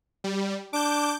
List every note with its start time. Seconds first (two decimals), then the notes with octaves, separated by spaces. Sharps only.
0.24 G3
0.73 D4 D6 G6